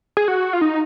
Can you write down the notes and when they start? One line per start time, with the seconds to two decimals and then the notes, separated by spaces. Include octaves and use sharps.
0.17 G#4
0.28 F#4
0.53 F4
0.61 D#4